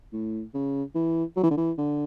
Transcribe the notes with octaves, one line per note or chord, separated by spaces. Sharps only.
A2
C#3
E3
F#3
E3
D3
E3
D3